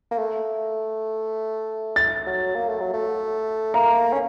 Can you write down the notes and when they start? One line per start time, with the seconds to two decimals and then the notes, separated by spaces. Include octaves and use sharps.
0.11 A#3
0.18 A3
1.96 A6
2.26 F#3
2.55 A#3
2.68 A3
2.81 F#3
2.93 A3
3.74 A#3 A#5
4.13 C#4